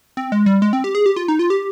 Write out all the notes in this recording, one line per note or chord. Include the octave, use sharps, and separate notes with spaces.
C4
G#3
G3
G#3
C4
G4
G#4
G4
F4
D#4
F4
G4